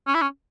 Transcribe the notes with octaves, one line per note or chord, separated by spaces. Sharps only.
C#4
E4
C#4